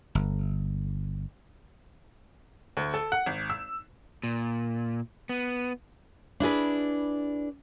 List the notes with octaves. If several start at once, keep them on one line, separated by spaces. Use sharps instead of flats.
G1
D2
A4
F#5
G#1
E6
A#2
B3
D4 E4 G#4 B4